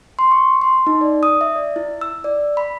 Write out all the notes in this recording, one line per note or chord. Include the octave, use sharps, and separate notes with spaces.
C6
C#6
C6
D#4
D5
D#6
E5
D5
E4
E6
D5
B5